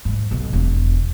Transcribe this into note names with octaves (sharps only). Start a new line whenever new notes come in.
G#2
B1
E1